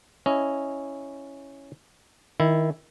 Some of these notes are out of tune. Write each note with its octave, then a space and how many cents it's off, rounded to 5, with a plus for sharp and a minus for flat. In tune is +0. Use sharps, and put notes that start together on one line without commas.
C#4 +0 E4 +0 D#5 +0
D#3 +20 E4 +0